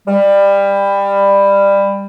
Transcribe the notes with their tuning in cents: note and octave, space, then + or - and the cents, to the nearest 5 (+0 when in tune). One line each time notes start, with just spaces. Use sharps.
G3 +20